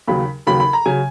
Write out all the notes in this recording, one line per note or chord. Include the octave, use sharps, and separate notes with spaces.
D#2 C#3 F#3 B5
D#2 C#3 F#3 B5
B5
A#5
C#3 F#3 G#5